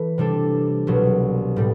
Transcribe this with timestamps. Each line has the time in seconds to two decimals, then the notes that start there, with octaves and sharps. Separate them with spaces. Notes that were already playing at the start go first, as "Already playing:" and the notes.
Already playing: E3 A3
0.18 C3 G3 D4 A4
0.87 C2 B2 F#3
1.56 A2 G3